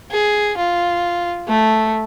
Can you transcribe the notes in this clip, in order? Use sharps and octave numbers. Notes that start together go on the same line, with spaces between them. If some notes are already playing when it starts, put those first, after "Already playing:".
G#4
F4
A3